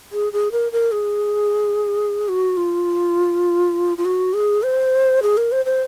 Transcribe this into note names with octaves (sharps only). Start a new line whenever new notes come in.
G#4
G#4
A#4
A#4
G#4
F#4
F4
F4
F#4
G#4
C5
G#4
A#4
C5
C5